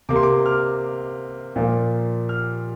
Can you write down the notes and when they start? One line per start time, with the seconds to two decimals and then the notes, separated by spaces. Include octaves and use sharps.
0.09 C3 A#3 D6
0.16 C6
0.23 D6
0.46 F6
1.56 A#2 F3 A#3
2.29 F6